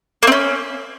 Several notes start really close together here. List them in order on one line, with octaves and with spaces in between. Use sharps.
A#3 C4 C#4